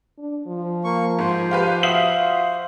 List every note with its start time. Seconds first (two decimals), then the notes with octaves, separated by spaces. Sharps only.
0.18 D4
0.47 F3
0.84 A#3 C#6
1.19 G#2 C5
1.51 F4 G4 B4
1.83 F#4 E5 F5 D#6 F#7